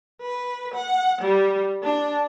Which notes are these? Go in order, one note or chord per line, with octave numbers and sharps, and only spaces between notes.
B4
F#5
G3
D4